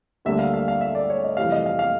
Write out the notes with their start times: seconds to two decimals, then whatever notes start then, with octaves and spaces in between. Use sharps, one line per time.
0.25 D2 D3 G3 A#3 D4 E5
0.39 F5
0.54 F5
0.68 F5
0.81 E5
0.95 D5
1.10 C#5
1.24 D#5
1.37 F2 C3 E3 G3 F5
1.52 D#5
1.66 F5
1.79 F5